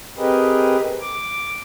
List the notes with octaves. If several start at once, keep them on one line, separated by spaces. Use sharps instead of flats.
C4 G4 G#4 A#4 B4 D#5
D6